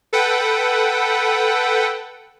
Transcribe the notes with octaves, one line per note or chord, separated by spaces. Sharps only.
A4 B4 F#5 G5